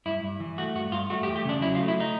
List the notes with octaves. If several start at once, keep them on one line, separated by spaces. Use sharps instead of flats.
G2 E4
G2
E3
A3 F#4
G2 F#4
G2 F4
A3 F#4
G4
E2
G4
C#3 D4
F#3 E4
F4
A3
E4
D#4